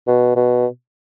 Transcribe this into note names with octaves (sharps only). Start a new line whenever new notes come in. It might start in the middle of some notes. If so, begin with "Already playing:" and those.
B2
B2